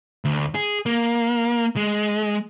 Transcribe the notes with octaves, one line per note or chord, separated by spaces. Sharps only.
D2
G#4
A#3
G#3